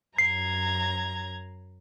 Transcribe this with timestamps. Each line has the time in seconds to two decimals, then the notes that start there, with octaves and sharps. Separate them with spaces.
0.18 F#2 A#5 G#6 C7